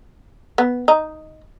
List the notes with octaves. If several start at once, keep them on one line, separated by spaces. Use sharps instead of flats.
B3
D#4